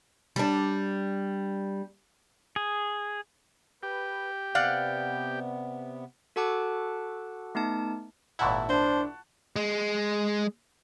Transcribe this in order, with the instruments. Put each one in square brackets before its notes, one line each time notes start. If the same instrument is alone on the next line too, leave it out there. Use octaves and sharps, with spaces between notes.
[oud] G3 D4
[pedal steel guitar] G#4
[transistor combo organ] G4 [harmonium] B4
[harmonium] C3 B3 [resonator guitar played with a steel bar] D5 F5 F#5
[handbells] F#4 A4 F#5 A5 D6 F#6
A3 B3 D#4 A5
[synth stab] G#1 A#2 E4 [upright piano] F#5 A5 C#6
[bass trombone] D4 [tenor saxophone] C5
[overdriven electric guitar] G#3